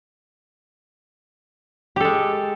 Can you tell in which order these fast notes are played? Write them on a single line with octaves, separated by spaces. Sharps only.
G4 A4 G#3